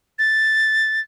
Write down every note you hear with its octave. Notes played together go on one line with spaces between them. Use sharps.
A6